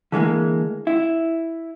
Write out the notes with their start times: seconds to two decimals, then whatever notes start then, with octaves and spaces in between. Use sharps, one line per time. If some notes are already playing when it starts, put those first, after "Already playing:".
0.12 D3 E3 G#3 A#3
0.87 E4